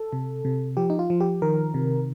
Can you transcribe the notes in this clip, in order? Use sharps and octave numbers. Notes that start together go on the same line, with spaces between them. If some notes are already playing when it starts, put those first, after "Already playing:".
Already playing: A4
C3
C3
F3 G4
D#4
F4
F3
G4
D#3 A#4
C3